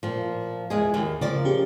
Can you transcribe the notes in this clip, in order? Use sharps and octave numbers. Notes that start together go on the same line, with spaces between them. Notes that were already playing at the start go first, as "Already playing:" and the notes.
A#2 F3
E2 G#3 G#4
D#2
C#3 F3 A#3 D5
C#4 G4 G#4